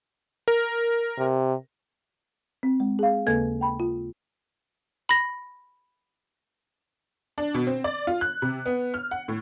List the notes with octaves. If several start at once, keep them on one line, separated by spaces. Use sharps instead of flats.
A#4
C3
C4
G#3
G#4 F5
D#2 C#3 A#3 A4 B4 G#6
G5 B5
F4
B5 A#6
D4
B2
C4
D5
F4
F#6
C3
B3
F6
F#5
A2